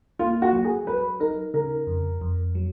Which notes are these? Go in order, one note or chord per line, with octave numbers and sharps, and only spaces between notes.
A#3 F4
F#4
F#3
G#4
F#3 B4
D#4 A#4
C#3 A#4
F2
F2
F#3